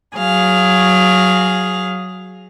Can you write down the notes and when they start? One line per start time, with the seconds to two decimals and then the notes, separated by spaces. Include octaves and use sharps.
0.17 F#3 G#4 F5